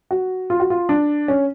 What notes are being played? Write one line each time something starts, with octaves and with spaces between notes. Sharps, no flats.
F#4
F4
F#4
F4
D4
C#4